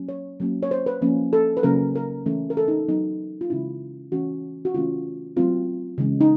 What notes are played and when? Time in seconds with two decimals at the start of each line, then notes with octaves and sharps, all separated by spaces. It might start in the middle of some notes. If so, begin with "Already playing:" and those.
Already playing: F#3 A#3 C#4
0.09 C#5
0.40 F#3 A#3 C#4
0.63 C#5
0.71 C5
0.86 B4
1.01 F3 A#3 C#4
1.33 A4
1.57 B4
1.63 C#3 F#3 A#3 C#4 A#4
1.95 A#4
2.26 E3 A3 C#4
2.50 A#4
2.57 A4
2.68 D#4
2.88 F#3 B3 D#4
3.41 F4
3.50 C#3 E3 G#3 C#4 E4
4.12 E3 A3 C#4 F#4
4.65 F#4
4.74 C#3 E3 A3 C#4 F4
5.37 F#3 A3 C4 F4
5.98 C#3 E3 G#3
6.21 D#4